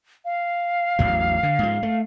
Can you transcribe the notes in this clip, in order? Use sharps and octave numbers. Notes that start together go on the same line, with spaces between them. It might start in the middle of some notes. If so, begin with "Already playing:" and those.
F5
A1 E2 F#3
D3
G#2 F3
A3